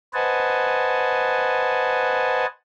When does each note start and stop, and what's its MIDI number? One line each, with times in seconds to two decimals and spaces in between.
0.14 2.46 71
0.14 2.46 72
0.14 2.46 75
0.14 2.46 78
0.14 2.46 80
0.14 2.46 81